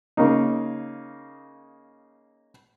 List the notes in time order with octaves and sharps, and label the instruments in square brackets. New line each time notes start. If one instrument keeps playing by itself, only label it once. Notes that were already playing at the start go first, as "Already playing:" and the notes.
[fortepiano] C#3 A#3 D#4